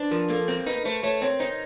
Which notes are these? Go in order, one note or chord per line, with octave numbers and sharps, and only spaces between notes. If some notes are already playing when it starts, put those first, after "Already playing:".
Already playing: D4 B4 C5
F3 A#4
A#3 A4
C4 A#4
D#4 B4
A3 C5
A3 C#5
C4 C#5
D#4 C5